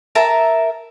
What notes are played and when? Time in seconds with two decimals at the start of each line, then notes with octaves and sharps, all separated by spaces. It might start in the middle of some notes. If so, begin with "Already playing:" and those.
0.15 A#4 E5 A5